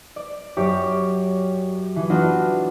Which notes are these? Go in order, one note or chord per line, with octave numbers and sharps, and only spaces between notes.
D5
F#2 G4 C#5 D6
E3
B3 D4 F4 F#4